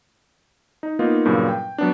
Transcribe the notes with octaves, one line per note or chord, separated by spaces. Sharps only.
D#4
A#3 B3 D#4 F4
G2 A#2 C#3 F#3
G5
F#3 B3 D4